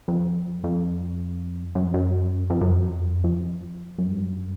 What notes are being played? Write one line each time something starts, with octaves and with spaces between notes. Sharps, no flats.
F2
F2
F#2
F2
F#2
F2
F#2
F2
F2
F#2
G2
F#2